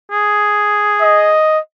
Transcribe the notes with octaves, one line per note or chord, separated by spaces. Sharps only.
G#4
D#5